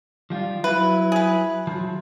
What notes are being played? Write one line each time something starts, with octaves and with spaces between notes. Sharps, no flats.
F3 G3 F4
F#3 E4 B4
G#4 B4
F3 F#3